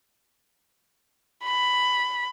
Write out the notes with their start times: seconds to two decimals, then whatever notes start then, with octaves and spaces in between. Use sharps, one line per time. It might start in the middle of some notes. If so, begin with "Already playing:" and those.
1.44 B5